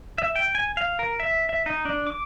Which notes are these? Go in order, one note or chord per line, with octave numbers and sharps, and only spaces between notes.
E5
G5
G#5
F5
A#4
E5
E5
D#4
D4
D6